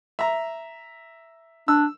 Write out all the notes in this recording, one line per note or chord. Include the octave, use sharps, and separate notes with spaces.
E5 A#5
D4 E6